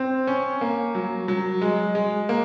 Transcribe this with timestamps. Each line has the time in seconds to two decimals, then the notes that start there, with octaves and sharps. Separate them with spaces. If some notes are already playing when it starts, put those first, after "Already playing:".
Already playing: C4
0.27 C#4
0.61 A#3
0.95 F#3
1.28 F#3
1.62 G#3
1.95 G#3
2.29 A#3